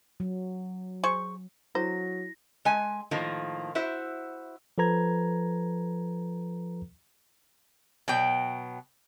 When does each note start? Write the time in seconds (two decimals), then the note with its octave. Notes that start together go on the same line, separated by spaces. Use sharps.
0.20 F#3
1.04 G#4 C5 C#6
1.75 D3 F#3 E4 C5 A#6
2.65 G#3 G#5
3.11 A2 D#3 F3 A#3
3.75 E4 F#4 C5 E5
4.78 F3 A4 B4 A#5 G#6
8.08 B2 F#3 G5